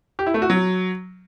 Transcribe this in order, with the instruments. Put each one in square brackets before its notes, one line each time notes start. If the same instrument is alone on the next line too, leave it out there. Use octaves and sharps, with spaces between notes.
[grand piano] G4
E4
A3
F#4
F#3